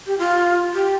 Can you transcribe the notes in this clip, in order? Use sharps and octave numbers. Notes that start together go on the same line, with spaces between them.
G4
F4
G4